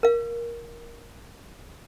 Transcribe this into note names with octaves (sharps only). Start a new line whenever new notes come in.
A#4 F5